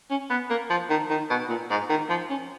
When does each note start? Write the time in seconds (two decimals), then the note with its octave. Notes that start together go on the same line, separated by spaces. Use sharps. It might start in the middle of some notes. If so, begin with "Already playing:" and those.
0.10 C#4
0.30 B3
0.50 A#3
0.70 F3
0.90 D#3
1.10 D#3
1.30 B2
1.49 A#2
1.70 G#2
1.89 D#3
2.09 F3
2.29 C#4